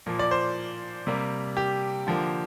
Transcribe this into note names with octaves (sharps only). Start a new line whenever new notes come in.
A#2 F3 A#3
D5
C5
C3 G3 A#3
G4
D3 F3 A#3